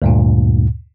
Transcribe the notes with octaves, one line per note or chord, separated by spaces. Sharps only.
D2 G2 A#2